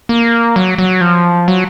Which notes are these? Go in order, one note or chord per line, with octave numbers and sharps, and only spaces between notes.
A#3
F#3
F#3
F3
F#3